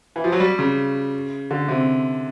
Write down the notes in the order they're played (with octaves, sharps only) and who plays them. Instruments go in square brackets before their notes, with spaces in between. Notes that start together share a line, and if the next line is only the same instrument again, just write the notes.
[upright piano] E3
F3
F#3
G3
C#3
D3
C3